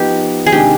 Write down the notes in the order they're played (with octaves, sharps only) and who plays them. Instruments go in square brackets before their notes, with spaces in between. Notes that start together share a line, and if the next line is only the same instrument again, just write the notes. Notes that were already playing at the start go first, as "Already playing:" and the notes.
Already playing: [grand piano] F3 B3 D#4 [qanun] G4
[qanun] G#4
[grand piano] C3 D#3 G#3 D4 [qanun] G4